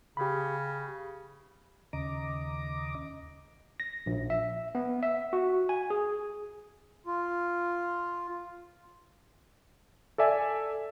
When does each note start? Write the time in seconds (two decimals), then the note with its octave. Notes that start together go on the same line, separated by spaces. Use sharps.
0.17 C#3 G4 B5
1.93 D#2 C#3 D#5 A#5 D6
3.80 A#6
4.06 A#1
4.30 E5
4.75 B3
5.03 E5
5.33 F#4
5.69 G#5
5.90 G#4
7.06 F4
10.18 A4 D5 E5 G#5